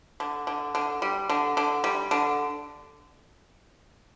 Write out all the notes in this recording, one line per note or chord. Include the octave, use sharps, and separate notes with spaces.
D3
D3
D3
G3
D3
D3
G3
D3